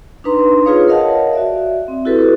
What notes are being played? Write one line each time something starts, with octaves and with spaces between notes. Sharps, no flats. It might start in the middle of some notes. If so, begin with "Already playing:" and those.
D4 D#4 B4 A#5 C6
F4 G#4 B4 C#5 F5 D#6
A#4 C#5 D#5 F5 F#5 A5
F#4 D5 E5
C4
E4 F#4 G4 A4 B4